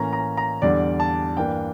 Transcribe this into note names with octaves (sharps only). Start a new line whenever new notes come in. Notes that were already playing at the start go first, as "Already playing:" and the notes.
Already playing: A2 E3 A#3 C#4 A#5
A#5
A#5
E2 D3 G3 D5
A5
G2 E3 A#3 D4 G5